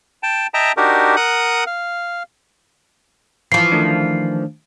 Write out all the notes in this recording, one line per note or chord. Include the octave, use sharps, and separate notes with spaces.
G5 A5
D#5 E5 G5 A5 A#5
D4 D#4 F#4 G4 A#4
A#4 F#5 D#6 F#6
F5
E3 F3 C7
D#3 A3 D4